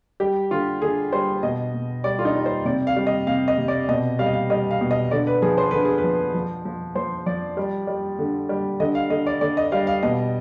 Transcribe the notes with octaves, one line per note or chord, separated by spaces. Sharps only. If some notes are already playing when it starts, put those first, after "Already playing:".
G3 G4
D3 F4
D3 G#4
G3 C5
B2 D#5
B2
G3 D5
F4
D#4
G3
C5
C3 D5
F5
G3
D#5
C3 F5
D#5
C3
D5
B2 D#5
G3 F5
D#5
F5
G3 D#5
F5
B2
D#5
D3 D5
B4
F3 G#4
C5
D3 B4
G#4
B4
F3
F3
F3
F3 C5
F3 D5
G3
G3
D3
G3
D3 D#5
F5
D3 D#5
D5
D3 D5
D#5
G3 F5
F5
B2 D#5